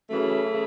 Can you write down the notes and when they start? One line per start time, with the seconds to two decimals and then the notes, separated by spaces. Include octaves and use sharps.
0.10 F#2 C#3 E3 A3
0.51 C#3